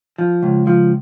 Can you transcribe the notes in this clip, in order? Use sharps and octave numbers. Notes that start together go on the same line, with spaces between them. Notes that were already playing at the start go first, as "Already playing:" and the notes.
F3
C#2
F3